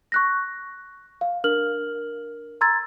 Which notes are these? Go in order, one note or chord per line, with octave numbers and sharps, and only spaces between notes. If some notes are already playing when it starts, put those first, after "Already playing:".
C#6 F#6 A#6
F5
D4 A#4 F6 F#7
A#5 C6 E6 G#6 A6